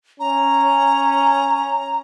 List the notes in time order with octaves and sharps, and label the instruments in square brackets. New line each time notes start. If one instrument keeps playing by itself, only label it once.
[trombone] C#4 [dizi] A#5